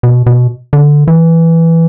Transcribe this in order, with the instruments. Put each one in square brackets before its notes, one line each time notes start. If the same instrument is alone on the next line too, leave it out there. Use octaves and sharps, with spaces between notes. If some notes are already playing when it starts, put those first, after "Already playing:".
[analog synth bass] B2
B2
D3
E3